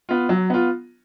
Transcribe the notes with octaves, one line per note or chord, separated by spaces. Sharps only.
B3 F4
F#3
B3 F4